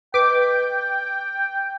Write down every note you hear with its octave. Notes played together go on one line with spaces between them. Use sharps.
B4 D#5 G5 D6